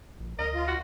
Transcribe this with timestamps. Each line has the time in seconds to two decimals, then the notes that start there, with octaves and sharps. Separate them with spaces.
0.20 A#1
0.39 D2 A#4 D#5
0.55 F4
0.68 F#4